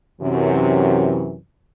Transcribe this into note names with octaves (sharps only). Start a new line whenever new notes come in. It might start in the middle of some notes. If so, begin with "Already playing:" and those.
F#2 C3 E3